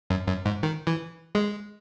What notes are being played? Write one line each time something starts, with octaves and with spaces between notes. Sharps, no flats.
F#2
F#2
G#2
D#3
E3
G#3